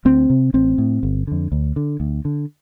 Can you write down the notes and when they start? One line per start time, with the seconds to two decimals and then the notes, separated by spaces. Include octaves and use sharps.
0.05 D2 C4
0.30 C3
0.54 A1 C4
0.78 A2
1.03 G1
1.27 F2 D3
1.52 D2
1.76 D3
2.00 D2
2.25 D3